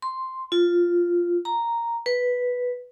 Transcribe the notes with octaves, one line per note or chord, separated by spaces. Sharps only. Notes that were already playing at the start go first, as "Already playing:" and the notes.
C6
F4
A#5
B4